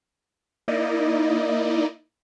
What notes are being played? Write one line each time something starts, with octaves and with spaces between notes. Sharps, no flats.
A#3 D#4 E4 D5 D#5